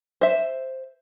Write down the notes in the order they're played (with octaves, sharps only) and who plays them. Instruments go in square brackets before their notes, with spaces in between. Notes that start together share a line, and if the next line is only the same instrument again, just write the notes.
[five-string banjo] C5 E5